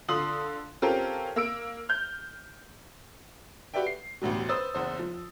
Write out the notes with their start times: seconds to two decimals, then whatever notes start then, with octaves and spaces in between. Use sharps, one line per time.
0.08 D3 F4 C6 D#6 F#7
0.82 C4 C#4 F4 G4 A4 A#4
1.36 A#3 E6 D7
1.89 F6 G6
3.74 F#4 G4 B4 D5 E5 G5
3.87 C7
4.21 A1 D2 G2 B2
4.49 B4 C5 D#6 E6 A6
4.74 F#1 E2 C5
4.99 F3